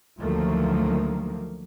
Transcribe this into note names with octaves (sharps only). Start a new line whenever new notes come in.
D2 D#3 F3 F#3 A3 A#3